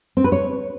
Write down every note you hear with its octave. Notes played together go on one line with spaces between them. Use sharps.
C4
B4
C#5